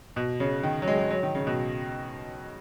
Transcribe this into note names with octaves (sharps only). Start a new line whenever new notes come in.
B2
C#3
D#3
F#3
G#3
G#3
F#3
D#3
C#3
B2